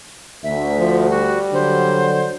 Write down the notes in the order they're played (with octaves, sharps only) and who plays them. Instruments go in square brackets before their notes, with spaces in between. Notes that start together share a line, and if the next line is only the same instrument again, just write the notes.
[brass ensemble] D2 [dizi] E5
[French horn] F3
[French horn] G3 [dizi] F#4
[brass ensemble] D3 F#3 [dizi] C5